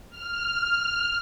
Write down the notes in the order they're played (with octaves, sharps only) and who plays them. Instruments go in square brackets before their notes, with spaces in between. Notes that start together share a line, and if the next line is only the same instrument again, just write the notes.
[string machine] F6